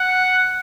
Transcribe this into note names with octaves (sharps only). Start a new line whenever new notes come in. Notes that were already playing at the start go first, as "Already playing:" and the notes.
Already playing: F#5